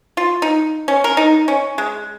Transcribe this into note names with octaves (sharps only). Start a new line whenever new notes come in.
F4
D#4
C#4
A#4
D#4
C#4
G#3